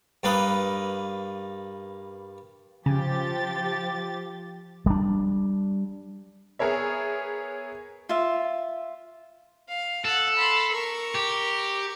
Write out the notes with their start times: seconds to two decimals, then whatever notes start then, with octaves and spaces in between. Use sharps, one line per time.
0.23 G2 A#3 B4 D#6
2.86 C#3 F3 G4 A6
4.86 G3 D4
6.59 B3 G#4 A#4 C#5 E5
8.09 F4 E5
9.68 F5
10.05 A4 F#5
10.37 B5 C6
10.73 A#4 C#6
11.15 G4